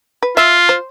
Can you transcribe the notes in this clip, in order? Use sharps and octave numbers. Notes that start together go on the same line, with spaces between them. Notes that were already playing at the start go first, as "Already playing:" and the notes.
B4
F4 E5
C5